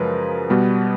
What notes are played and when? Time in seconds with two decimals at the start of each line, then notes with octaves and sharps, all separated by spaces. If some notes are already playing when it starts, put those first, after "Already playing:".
Already playing: F#2 C#3 F3 G#3 A#4 B4
0.50 B2 G3 B3